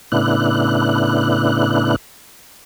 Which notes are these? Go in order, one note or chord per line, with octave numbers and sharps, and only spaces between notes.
A2 C#3 B3 D4 E4 F#6